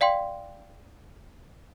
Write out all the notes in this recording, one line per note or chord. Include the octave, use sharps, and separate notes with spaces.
D5 F5 G5 C6